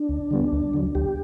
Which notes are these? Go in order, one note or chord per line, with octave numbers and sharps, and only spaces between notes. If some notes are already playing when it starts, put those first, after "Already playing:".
Already playing: D4
D2
D3 G3 B3
D2
D3 F#3
D2 G4